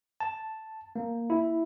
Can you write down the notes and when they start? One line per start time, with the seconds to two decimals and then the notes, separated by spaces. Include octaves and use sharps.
0.20 A5
0.96 A#3
1.30 E4